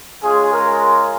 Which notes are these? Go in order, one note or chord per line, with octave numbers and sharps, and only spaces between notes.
G#3 C#4 F4 G#4
A#4